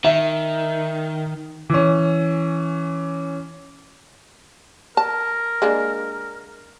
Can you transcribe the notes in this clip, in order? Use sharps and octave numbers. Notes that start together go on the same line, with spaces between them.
D#3 E5
E3 C#4
A#4 A5
G#3 A#3 D4